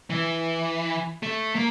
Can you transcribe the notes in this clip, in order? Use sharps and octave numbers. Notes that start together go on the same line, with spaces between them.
E3
A3
A#3